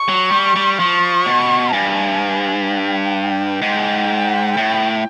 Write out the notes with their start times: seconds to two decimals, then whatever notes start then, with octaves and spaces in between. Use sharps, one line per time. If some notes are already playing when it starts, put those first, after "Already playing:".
Already playing: C#6
0.08 F#3
0.31 G3
0.56 G3
0.79 F3 C#6
1.26 B2
1.73 G2 G#5
2.68 G5
3.62 G#2
4.57 A2